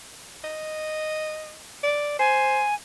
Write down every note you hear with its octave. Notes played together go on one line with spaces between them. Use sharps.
D#5
D5
C5 G#5